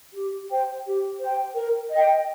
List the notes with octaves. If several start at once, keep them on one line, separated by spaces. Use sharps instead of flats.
G4
C5 G5
G4
C5 G5
A#4
D#5 G5